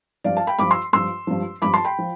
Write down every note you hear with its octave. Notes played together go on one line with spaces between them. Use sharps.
G2 F3 D5 F5
F5 A5
G5 B5
G2 F3 B5 D6
C6 E6
G2 F3 C6 E6
G2 F3
G2 F3 B5 D6
A5 C6
G5 B5
F3